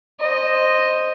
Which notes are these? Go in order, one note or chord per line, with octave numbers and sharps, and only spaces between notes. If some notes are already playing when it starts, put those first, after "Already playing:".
C5 D#5